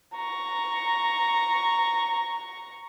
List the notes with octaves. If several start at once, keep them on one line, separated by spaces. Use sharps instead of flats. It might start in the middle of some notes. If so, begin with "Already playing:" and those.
A#5 C#6